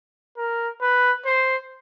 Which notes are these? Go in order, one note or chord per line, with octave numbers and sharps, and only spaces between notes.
A#4
B4
C5